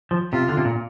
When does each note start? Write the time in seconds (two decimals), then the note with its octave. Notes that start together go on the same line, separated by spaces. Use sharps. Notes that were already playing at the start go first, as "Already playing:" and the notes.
0.11 F3
0.32 C3 F4
0.49 D3
0.57 C3
0.65 A#2